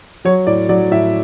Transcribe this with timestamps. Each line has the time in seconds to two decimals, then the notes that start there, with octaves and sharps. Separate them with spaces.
0.25 F#3 C#5
0.47 A2 D5
0.69 F#3 D5
0.91 A2 E5